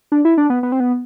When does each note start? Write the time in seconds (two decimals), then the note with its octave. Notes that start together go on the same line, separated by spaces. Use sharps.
0.12 D4
0.25 E4
0.38 D4
0.50 B3
0.63 B3
0.72 C4
0.80 B3